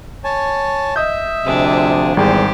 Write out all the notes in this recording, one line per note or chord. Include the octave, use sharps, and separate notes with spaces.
C#5 G#5 A5
D#5 E5 D#6 G6
D2 C3 F3 D4 G#4
G#1 E2 G3 G4 G#4 C5 G5